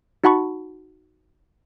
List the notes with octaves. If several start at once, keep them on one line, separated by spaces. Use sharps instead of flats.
D#4 F#4 F#5 A5 B5 C#6